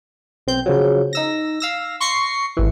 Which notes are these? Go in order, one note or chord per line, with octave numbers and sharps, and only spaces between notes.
B1 C4 G6
C#3 F3 F#3
D#4 E6 A#6
F5 E6 A#6
C6 C#6 A#6 C7 C#7
G#1 E3